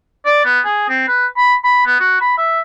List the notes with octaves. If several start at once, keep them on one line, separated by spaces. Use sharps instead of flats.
D5
B3
G#4
C4
B4
B5
B5
B3
F#4
B5
E5